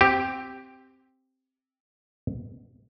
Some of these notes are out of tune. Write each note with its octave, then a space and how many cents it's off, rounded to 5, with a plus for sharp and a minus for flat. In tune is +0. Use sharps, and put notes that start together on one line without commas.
C4 +0 G4 +0